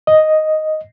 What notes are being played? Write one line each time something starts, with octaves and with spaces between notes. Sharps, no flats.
D#5